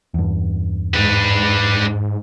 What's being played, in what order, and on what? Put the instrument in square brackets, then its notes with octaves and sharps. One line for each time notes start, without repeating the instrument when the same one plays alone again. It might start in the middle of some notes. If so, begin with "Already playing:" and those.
[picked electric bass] E2 G2
[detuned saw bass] G#2 [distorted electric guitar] D4 B4